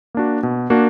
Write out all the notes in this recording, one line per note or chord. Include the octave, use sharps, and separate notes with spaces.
A#3 D4 F#4
B2
A#3 D4 F#4